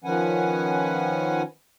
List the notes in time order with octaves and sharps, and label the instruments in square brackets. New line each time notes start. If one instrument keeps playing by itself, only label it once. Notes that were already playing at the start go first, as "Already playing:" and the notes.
[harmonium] D#3 F3 C#4 B4 F#5 G#5